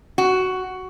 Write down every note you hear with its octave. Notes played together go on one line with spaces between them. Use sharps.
F#4